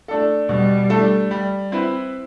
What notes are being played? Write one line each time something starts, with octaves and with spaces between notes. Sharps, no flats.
A3 D4 A4
B2 G3
A3 D4 A4
G3
C4 E4 B4